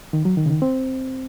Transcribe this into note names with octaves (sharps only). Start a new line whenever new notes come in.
D#3
F#3
D#3
C#3
D#3
C4